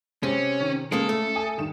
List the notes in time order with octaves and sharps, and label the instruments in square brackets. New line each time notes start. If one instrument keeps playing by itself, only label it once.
[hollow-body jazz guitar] C3 [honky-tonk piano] G#3 [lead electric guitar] C#4
[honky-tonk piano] D#3
[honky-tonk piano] C#3 [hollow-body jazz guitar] G#3 A#3 [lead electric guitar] A4
[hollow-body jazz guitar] A3
[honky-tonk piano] E5 G#5 D#6
G2 D#3 E7